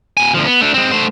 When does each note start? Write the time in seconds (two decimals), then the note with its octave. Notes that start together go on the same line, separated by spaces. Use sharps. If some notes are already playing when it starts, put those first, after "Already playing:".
0.17 B2 G#5
0.34 D2 F3
0.46 B3
0.61 A3 D4
0.74 G#3 C4
0.92 A3 C5